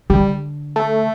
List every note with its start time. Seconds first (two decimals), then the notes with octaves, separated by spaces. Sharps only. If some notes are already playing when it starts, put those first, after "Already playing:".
0.10 D3 G3
0.76 A3